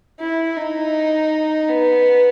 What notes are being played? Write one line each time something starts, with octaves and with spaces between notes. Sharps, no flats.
E4
D#4
B3